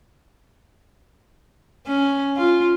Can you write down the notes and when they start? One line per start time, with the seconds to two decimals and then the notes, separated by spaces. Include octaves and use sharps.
1.87 C#4
2.37 F4